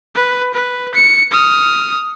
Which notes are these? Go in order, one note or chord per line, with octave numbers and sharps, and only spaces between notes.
B4
B4
C#7
D#6 F6